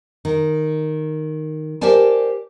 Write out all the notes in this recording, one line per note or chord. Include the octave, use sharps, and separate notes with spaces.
D#3
G4 A#4 C5 D5 G#5 A5